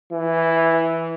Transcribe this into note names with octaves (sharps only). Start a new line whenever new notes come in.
E3